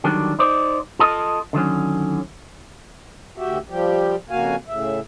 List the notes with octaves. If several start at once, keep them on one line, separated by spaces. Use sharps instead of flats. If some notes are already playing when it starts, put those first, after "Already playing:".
D3 D#3 F#3 G3 D4
D#4 C5 D5
F4 A4 D#5
D3 D#3 F#3 C#4
D2 F#4 G4 E5
F3 G3 G4
F2 C#3 A#3 F#4 F5 G#5
A2 C#3 E5